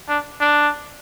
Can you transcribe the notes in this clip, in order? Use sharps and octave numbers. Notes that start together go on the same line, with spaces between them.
D4
D4